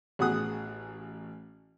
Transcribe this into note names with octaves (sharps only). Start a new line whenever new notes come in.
A1 B3 F#4 G#4 D#6 F#6